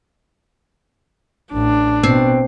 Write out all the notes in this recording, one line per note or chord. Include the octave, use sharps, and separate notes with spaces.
A1 D4
B2 C4